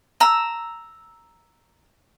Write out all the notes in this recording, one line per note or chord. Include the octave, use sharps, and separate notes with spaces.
A#5 E6